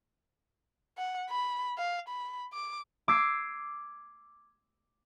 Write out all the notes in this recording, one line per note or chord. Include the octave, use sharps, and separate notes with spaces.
F#5
B5
F5
B5
D6
D6 E6 G#6 C7